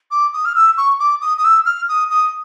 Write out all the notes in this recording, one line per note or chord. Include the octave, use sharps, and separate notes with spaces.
D6
D#6
F6
E6
C#6
D6
D#6
D#6
E6
F6
D#6
D#6